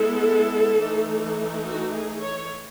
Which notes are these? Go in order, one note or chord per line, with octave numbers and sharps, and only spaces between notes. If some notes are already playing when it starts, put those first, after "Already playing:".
Already playing: G#3 B3 E4 A4
E3 A3 D#4
F#4
G#4
C#5